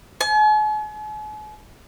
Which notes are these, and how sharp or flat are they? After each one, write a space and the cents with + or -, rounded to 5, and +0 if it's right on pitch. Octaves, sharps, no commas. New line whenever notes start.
G#5 +45